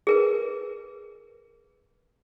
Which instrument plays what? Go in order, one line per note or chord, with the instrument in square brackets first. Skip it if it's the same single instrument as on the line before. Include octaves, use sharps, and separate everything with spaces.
[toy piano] G#4 A#4 B4